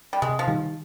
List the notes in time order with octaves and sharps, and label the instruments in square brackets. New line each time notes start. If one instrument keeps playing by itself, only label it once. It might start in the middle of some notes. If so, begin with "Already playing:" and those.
[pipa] G3
[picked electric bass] C3 [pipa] G#3
[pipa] F3
[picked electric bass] D#3 G3